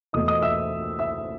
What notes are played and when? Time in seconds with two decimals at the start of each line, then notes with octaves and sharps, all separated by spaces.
0.13 E2 B2 A3 D#5 D#6
0.28 D#5 D#6
0.42 E5 E6
0.99 E5 E6